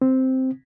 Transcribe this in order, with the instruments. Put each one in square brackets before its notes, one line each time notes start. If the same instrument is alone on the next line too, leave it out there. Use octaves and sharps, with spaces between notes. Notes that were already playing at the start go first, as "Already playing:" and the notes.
[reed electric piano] C4